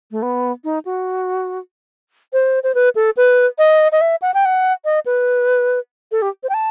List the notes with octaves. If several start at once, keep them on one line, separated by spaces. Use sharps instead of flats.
A3
B3
D#4
F#4
C5
C5
B4
A4
B4
D#5
D#5
E5
F#5
G5
F#5
D#5
B4
A4
G4
C5
G5
A5